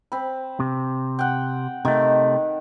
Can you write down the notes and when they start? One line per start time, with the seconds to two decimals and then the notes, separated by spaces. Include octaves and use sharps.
0.12 C4 B5
0.60 C3
1.19 F#5 G5
1.85 C3 D#3 A3